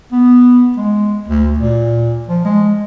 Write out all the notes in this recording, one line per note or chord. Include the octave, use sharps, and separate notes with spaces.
B3
G#3
D2
A#2
F3
G#3